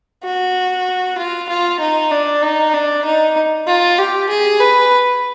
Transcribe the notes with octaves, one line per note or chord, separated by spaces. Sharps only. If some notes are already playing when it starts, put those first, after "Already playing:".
F#4
F4
F4
D#4
D4
D#4
D4
D#4
F4
G4
G#4
B4